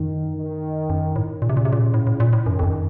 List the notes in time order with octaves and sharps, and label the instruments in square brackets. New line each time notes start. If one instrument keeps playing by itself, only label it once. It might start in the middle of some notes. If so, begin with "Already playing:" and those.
Already playing: [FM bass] F#2 [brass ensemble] D#3
[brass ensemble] D#3
[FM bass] F#2
A2
[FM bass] A#2 [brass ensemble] C#3
[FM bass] C3
A#2
C3
A#2
A2
A2
A#2
A2
[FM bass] F#2 [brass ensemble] D#3
[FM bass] F2
F#2